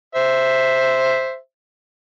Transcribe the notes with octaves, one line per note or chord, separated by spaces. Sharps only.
C5 E5